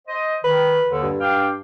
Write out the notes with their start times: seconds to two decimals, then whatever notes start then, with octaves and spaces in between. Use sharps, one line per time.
0.07 C5 D#5
0.44 D#3 B4
0.87 D#2 D3
1.03 G2
1.20 D4 F5 G5